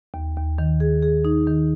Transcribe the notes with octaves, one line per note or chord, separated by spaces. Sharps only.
D#2
D#2
D#3
G#4
G#4
D#4
D#3